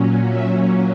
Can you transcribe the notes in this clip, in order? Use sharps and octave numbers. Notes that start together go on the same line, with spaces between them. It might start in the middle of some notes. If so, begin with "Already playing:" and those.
Already playing: A#2 F#3 C#4
E5